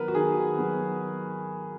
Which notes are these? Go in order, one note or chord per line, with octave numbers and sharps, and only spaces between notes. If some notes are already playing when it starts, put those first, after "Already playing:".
Already playing: D#3 F#3 B3 A#4 B4
F#4
D#3 G#4
F#3 B3